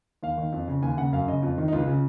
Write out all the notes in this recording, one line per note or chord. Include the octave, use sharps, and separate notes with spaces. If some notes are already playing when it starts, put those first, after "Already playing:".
D#2 F5
D#3
F2
C#3
D#2 G#5
C#3 F#5
F#2 F5
C#3 D#5
F2 F4
D#3 D#4
D#4
C#2 F4
F4
C#3